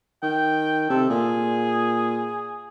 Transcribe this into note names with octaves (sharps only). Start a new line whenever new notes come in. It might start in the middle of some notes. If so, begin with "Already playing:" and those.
D#3 G5
C3 A4
A#2 G#4